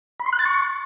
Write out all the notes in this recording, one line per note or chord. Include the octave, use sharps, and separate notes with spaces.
B5
C6
F#6
A6
C#6